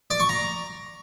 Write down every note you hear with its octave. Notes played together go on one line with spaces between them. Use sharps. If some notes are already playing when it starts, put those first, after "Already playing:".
D5
C#6
A#5